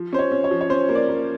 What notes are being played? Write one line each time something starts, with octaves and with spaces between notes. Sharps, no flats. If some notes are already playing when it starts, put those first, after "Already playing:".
Already playing: F3
C#4 C5
C#5
C#4
C#5
F3
C#5
C#4 C5
A#3
D5
A#3